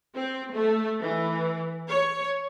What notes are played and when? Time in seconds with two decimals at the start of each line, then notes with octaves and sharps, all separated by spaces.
0.16 C4
0.53 A3
1.02 E3
1.88 C#5